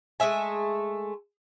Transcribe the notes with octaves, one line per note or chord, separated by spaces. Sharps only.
G#3 A3 E5 G#5